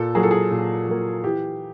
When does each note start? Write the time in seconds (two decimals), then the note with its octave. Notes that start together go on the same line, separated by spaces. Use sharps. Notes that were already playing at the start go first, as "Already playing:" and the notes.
Already playing: A#2 A4
0.15 F#3 A#3 G#4
0.23 A4
0.31 G#4
0.51 A#2
0.87 F#3 A#3
1.24 E3 G4